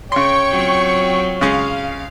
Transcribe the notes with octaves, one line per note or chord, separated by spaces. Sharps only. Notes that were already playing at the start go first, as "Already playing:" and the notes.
C#3 C#5 G5 C6 C#6
F#3 C4 F4
C#3 G#3 C#4 F5